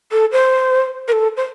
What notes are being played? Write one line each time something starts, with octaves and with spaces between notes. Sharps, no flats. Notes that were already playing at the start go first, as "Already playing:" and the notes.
A4
C5
A#4
A4
C5